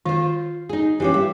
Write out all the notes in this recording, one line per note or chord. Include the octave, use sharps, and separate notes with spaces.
D#3 F4 C5
D#4 G#4
E3 F3 C#4 G4
G3 E5